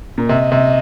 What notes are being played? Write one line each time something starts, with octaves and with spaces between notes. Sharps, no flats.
A#2
C3 D#5
C3